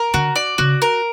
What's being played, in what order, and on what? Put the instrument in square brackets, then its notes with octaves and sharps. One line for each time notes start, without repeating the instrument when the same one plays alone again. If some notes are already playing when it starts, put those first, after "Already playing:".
Already playing: [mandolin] A#4
[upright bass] D3 [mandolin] F#4
[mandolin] D5
[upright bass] C#3 [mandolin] F#4
[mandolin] A#4